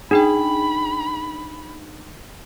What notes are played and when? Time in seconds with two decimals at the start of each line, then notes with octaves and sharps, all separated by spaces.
0.11 D4 D#4 G#4 G5 B5